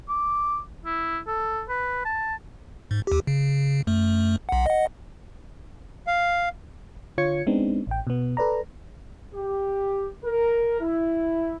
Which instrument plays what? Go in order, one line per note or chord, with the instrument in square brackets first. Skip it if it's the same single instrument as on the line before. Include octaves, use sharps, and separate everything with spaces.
[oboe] D6
E4
A4
B4
A5
[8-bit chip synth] G#2
D#2 G4
C#3
F#2 A3
B1 F#5
D#5 F#5
[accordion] F5
[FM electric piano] D3 F4 C#5 G#6 C#7
G#3 B3 C4 D4 D#4
A1 G5
B2 B3
A4 B4 D5 A#5
[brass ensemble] G4
A#4
E4